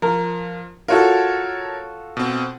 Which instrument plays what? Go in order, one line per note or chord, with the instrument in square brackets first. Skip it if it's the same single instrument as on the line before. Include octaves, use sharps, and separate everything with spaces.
[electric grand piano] F3 [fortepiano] A#4
[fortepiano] F4 F#4 A4 [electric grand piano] A#4 C#5 A5
[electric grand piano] B2 C4